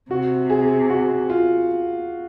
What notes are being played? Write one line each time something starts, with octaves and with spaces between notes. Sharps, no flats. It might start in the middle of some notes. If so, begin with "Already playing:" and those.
C3 F#4
G#4
F#4
F4